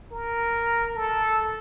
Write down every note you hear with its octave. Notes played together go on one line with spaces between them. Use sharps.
A#4
A4